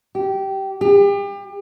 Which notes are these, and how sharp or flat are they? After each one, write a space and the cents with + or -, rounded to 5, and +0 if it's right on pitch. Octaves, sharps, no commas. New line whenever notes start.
G4 -15
G4 +35